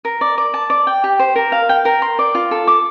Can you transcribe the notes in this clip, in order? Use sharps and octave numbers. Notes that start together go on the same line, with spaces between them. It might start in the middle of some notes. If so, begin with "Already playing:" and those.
A#4
D5
D5
A5
D5
G5
G4
C5
A#4
F5
G5
A#4
C6
D5
F4
A4
D6